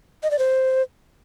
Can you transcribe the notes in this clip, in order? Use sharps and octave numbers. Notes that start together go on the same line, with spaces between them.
D#5
D5
C5